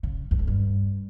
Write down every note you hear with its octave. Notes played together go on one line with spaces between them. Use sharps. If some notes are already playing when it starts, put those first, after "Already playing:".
C#3
E2
F2
G2